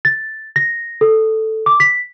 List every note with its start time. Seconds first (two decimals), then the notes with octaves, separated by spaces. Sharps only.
0.05 A6
0.56 A#6
1.01 A4
1.66 D6
1.80 B6